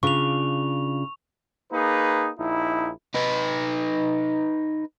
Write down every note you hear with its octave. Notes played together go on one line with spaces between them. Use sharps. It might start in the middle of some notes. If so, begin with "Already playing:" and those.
C#3 D4 F4 C#6 F7
A#3 D#4 G#4 B4
A#1 D#4 E4
D#4 B4